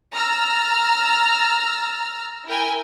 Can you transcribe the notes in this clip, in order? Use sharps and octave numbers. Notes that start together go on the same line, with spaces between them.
A#5 E6 F6 A6
E4 A#4 G5 G#5